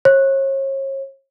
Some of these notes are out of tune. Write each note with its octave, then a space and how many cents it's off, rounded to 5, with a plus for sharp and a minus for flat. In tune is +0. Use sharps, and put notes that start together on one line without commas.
C#5 -40